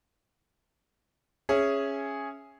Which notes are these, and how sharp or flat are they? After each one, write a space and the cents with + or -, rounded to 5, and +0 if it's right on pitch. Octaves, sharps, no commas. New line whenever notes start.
C#4 +0 G#4 +0 E5 +10